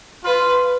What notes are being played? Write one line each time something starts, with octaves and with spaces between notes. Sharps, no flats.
F4 B4